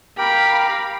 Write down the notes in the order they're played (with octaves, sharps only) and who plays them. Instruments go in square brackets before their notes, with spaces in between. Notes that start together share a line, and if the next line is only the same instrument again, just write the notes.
[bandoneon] G4 A#4 G5 [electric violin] F5 B5